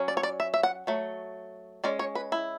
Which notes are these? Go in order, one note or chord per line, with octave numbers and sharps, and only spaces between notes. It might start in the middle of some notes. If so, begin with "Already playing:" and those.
Already playing: F#3 C#4
D5
C#5
D5
E5
E5
F#5
F#3 A3
G#3 C#4 D5
C#5
B4
E4